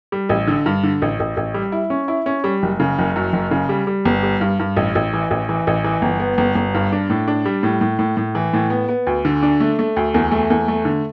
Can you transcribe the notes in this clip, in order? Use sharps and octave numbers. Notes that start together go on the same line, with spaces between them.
G3
A1
D3
G2
D3
A1
A1
A1
G3
E4
C#4
E4
C#4
G3
F#1
C#3
F#1
F#2
F#1
C#3
G3
G3
G1
G3
G2
G2
A1
A1
E3
A1
E3
A1
E3
G1
B3
G1
G1
G2
D4
A2
D4
G3
A2
A2
A2
A2
E3
A2
B3
B3
D2
D3
D4
A3
A3
D2
E2
A3
E2
A3
D3